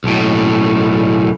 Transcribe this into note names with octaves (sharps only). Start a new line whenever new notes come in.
B1 A2